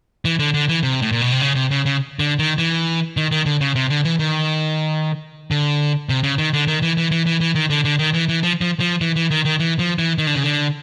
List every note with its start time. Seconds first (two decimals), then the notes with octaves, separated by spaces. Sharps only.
0.25 E3
0.39 D3
0.54 D3
0.69 E3
0.83 C3
1.02 A2
1.12 A#2
1.21 B2
1.32 C3
1.42 C#3
1.56 C3
1.71 C#3
1.86 C#3
2.19 D3
2.39 D#3
2.58 E3
3.17 D#3
3.31 D#3
3.46 D3
3.61 C#3
3.75 C3
3.90 D3
4.05 E3
4.19 D#3
5.51 D3
6.09 C3
6.23 C#3
6.38 D#3
6.53 D3
6.68 D#3
6.82 E3
6.97 E3
7.11 E3
7.26 E3
7.41 E3
7.55 D#3
7.70 D3
7.85 D3
7.99 D#3
8.14 E3
8.29 E3
8.43 F3
8.61 F3
8.80 F3
9.01 E3
9.16 E3
9.31 D#3
9.45 D#3
9.60 E3
9.79 F3
9.99 E3
10.18 D#3
10.27 D3
10.36 C#3
10.44 D3